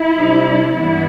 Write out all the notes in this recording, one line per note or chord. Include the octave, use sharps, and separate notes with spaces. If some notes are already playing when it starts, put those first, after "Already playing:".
Already playing: E4
C3 G3 D4
G2 E3 G3 B3 E4